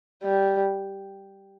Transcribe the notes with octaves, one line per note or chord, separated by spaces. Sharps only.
G3